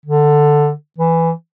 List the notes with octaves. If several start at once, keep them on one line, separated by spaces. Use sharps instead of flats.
D3
E3